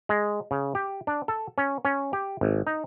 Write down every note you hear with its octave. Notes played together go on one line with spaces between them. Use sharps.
G#3
C#3
G4
D4
A4
C#4
C#4
G4
G#1
D#4